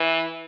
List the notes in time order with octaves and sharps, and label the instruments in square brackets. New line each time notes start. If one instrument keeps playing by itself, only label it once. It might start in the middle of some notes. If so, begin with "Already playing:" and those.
Already playing: [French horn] E3